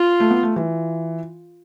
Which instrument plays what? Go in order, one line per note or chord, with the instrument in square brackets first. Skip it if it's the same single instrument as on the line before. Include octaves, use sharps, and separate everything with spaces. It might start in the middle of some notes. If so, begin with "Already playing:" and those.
Already playing: [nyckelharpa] F4
[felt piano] A3
B3
A3
E3